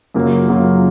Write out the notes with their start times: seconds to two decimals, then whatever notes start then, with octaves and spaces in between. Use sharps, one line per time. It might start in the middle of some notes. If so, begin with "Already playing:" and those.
0.14 F#2 C#3 F#3 A#3 F4
0.48 F#2 C#3 F#3 A#3 F4